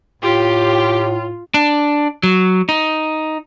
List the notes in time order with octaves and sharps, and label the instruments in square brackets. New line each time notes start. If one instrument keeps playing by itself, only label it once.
[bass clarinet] A2 [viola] F4 [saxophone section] G4
[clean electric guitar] D4
F#3
D#4